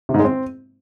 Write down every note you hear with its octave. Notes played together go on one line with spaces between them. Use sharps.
C3
G#2
G#3
C4